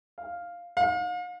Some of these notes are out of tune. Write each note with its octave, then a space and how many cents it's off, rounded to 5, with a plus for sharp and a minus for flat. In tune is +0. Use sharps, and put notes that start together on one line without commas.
F5 +0
F5 +40